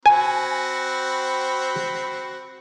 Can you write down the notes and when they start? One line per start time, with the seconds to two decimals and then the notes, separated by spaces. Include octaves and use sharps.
0.06 C4 F#4 G#5 B5